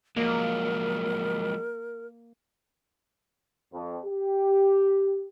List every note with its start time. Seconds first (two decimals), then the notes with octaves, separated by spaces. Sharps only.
0.16 F3 F#3 G#3 A#3 A#4
3.73 F2
4.05 G4